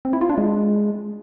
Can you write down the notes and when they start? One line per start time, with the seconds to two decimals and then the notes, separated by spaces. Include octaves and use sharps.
0.05 C4
0.13 E4
0.21 F4
0.29 D4
0.38 G#3